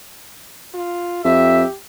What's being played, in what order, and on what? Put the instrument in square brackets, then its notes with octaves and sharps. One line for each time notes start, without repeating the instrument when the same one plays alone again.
[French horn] F4
[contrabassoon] F2 [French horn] G4 [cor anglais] E5